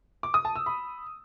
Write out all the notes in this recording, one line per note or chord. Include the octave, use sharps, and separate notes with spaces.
D6
D#6
A5
E6
B5